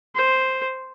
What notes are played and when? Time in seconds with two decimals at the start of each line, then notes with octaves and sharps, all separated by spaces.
0.15 C5